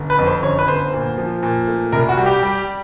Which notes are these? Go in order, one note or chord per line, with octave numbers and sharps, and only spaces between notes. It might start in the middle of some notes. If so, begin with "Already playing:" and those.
Already playing: G1
B4
F2
C5
G1 C#5
B4
G1 C5
A#2
F3
A#2
A3
C2 A#4
F#4
G3
G4
G3